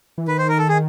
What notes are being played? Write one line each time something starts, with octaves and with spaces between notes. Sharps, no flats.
E3
D#3 B4
C5
A#4
A4
G#4